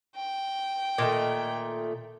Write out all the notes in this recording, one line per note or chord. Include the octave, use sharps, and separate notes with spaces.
G5
A#2 D#3 A3